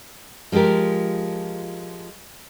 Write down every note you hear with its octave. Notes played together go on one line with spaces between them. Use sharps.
F3 G#3 F4 G4 A#4